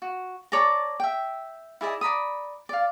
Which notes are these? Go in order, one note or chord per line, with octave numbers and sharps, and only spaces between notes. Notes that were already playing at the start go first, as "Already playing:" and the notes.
F#4
C#5 D5 A5 A#5
E5 G5
E4 G#4 D5 D#5
D5 A#5 B5 D#6
D5 F5